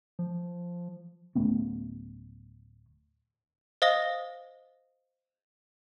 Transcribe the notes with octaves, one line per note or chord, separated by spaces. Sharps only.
F3
D1 A3 B3 C#4
C5 D#5 F5 D#6 A#6 G7